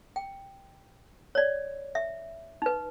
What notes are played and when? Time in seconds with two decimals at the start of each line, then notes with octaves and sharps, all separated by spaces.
0.16 G5
1.35 C#5 D5
1.95 E5
2.62 D#4 B4